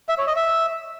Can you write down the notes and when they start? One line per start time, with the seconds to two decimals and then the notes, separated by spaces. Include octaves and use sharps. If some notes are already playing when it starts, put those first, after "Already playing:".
0.09 E5
0.18 C#5
0.27 D#5
0.36 E5